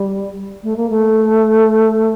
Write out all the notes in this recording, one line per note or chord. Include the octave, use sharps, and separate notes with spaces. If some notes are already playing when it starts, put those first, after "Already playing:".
Already playing: G3
A3
A#3
A3